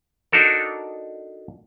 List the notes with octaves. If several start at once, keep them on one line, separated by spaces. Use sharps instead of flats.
D4 D#4 F#4 A4 A#4